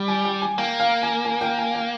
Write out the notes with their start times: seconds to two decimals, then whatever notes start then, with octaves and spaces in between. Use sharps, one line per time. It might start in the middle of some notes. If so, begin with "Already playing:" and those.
Already playing: G3
0.08 G#5
0.25 G5
0.42 G#5
0.58 A#3 G5
0.80 F5
1.03 G#5
1.25 G#5
1.41 G5
1.58 G#5
1.74 G5